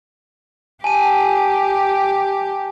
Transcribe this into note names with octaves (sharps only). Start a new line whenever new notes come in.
G4 G#5 A5 D#7